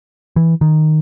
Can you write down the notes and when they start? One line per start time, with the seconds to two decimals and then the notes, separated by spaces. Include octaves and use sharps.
0.36 E3
0.61 D#3